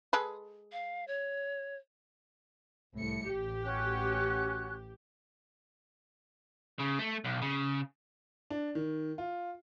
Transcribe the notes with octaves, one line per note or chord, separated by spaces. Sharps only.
G#3 A4 B4
F5
C#5
C2 A2 C#7
A1 G4
C#4 F#4 F#6
C#3
A3
B1
C#3
D4
D#3
F4